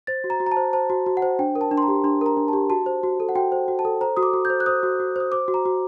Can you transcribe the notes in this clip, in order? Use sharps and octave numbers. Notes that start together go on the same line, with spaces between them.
C5 A6
F#4
A#5
F#4
A#5
A5
C5
C5 A5
F#4
F#4
F#5
C5
D4 G5
A#4
A5
D4
C6
A#5
G4
D4 C6
A#4 A#5
D4
A5
G4
F#4 A5
C5
F#4
A4
F#5
F#4 G5
C5
F#4
A5
A4
C5 A#5
F#4 D#6
D6
F#4
G6
C5
F#6
C5 D#6
F#4
F#4
C5 D#6
C5 D6
F#4
A#5
F#4